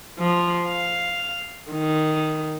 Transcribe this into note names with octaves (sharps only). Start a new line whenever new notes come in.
F3
F5
D#3